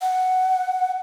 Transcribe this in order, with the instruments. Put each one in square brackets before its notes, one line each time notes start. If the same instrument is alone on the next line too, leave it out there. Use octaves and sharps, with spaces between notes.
[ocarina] F#5